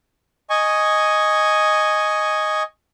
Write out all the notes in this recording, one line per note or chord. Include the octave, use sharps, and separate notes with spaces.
D#5 G#5 C#6